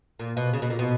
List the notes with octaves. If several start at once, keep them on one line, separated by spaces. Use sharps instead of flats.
A#2
B2
C#3
B2
A#2
B2